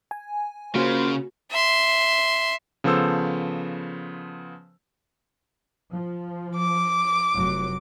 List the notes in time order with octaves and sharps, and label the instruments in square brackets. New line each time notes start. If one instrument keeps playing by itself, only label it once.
[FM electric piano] G#5
[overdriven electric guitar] C#3 [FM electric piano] A#3 F#4 [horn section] F4 A#4 C5
[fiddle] E5 C6
[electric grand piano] C#3 F3 B3 A4 C5 E6
[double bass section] F3
[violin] D6
[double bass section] F1 F#3